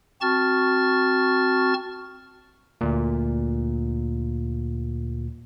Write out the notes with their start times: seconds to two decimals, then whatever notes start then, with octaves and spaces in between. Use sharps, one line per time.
0.21 C4 F#4 A5 C#6 F6 A6
2.81 D2 A#2